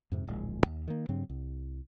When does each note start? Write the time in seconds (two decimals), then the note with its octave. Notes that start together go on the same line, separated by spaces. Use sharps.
0.12 F2 G#2 C3
0.27 D1 A#1 G#3
0.66 D#2
0.88 D#3 A#3
1.09 G2 C#3 F#3 C4
1.30 C2